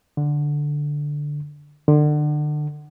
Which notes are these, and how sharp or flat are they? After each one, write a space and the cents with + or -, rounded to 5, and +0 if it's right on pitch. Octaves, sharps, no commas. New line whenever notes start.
D3 +0
D3 +30